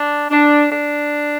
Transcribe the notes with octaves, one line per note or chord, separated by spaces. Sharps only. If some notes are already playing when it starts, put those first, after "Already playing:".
Already playing: D4
D4
D4